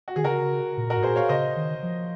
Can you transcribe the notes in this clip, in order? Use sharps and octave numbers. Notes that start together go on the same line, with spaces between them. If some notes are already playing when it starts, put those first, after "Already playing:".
F#4
D#3 G#4
C#3 F#4 A#4
A#2
F#4 A#4
G#2
A#2 G#4 C5
C#5 F5
C#3 C5 D#5
D#3
F3